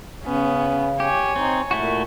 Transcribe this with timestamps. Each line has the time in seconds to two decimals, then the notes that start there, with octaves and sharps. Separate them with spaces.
0.23 C#3 B3 C#4
1.00 G4 C#5 G#5
1.36 C4 D#4
1.71 A#2 A3 E4 F#4